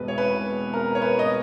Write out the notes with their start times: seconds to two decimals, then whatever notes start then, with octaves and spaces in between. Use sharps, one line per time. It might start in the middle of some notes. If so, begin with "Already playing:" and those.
Already playing: E1 E2 B2 B4
0.08 C#5
0.18 B4
0.73 A#4
0.95 C#5
1.02 B4
1.19 D#5